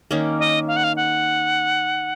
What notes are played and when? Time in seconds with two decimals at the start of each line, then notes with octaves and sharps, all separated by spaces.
0.11 D#3 A#3 C#4
0.39 D#5
0.68 F5
0.76 F#5
0.84 F5
0.96 F#5